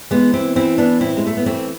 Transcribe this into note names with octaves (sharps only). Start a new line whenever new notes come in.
E3 G#3 B3
C4 E4
E3 C4 E4
B3 D4
A2 C4 E4
G#3
A3
B3
E3 A3 C4